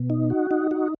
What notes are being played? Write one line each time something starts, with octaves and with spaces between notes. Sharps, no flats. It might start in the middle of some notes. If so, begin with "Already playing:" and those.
Already playing: B2
D#4
F#4
D#4
F#4